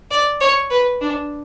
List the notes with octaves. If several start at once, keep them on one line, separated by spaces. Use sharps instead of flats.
D5
C#5
B4
D4